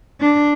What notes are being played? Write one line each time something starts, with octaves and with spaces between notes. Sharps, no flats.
D4